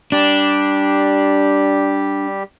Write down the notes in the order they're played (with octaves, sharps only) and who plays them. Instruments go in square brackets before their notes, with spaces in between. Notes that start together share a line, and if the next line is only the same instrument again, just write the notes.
[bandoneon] G3 G4 [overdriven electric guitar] D4